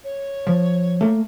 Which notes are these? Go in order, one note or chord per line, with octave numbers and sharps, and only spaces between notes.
C#5
F3
A3 A#3